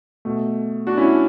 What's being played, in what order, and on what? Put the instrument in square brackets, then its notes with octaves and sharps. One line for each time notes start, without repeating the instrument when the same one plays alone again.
[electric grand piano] B2 A3
D4 F#4
C#4 E4
D4